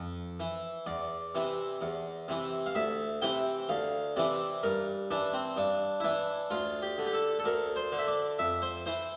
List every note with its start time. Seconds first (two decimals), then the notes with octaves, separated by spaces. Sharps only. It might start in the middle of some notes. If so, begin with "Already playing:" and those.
Already playing: F2
0.40 E3
0.86 E2 D5
1.35 C3 E3
1.81 E2
2.28 C3 E3
2.66 F5
2.75 D2 E5
3.22 C3 E3 G5
3.69 D2 F5
4.16 C3 E3 D5
4.63 G2 A#4
5.11 E3 D4
5.33 C4
5.56 G2 D4
6.00 E4
6.04 E3 D4
6.50 D2 F4
6.82 G4
6.98 D3
7.06 G4
7.14 A4
7.39 A4
7.44 D2 A#4
7.76 C5
7.92 D3
7.99 E5
8.08 D5
8.39 F2 E5
8.62 C5
8.86 E3 C5